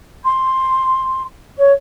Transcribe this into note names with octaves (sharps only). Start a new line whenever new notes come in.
C6
C#5